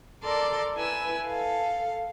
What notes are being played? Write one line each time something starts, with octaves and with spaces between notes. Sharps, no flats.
A4 A#4 D5 C6 D6
E4 B4 G#5 E6
A4 F5